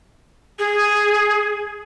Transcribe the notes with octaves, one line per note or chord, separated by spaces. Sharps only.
G#4